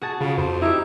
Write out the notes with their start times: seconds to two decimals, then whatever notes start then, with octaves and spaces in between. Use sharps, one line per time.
0.02 F#4 G#4 A5
0.21 C#3 F4
0.38 F2 C5
0.62 D#4 E4 G4